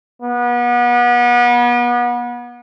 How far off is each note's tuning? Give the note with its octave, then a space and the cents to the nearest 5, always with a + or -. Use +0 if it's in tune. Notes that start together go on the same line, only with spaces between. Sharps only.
B3 -35